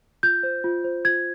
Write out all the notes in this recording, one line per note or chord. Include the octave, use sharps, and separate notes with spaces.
F4 G6
C5
F4
C5
F4 G#6